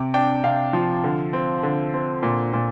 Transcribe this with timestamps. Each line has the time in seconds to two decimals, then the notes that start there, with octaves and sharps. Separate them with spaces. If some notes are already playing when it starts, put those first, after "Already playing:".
Already playing: C3 D6
0.14 D4 G5
0.44 C3 F5
0.73 F3
1.04 D3
1.33 C4
1.63 D3
1.94 C4
2.23 A#2
2.53 A#2